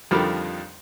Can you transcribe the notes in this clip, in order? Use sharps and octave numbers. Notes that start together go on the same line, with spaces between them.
F2 D3 D#3 F3 G3